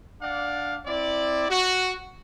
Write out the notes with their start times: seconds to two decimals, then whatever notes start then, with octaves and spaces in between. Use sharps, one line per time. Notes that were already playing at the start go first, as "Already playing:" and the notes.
0.21 D4 D5 F5 F#5
0.85 C4 E4 D5
1.48 F#4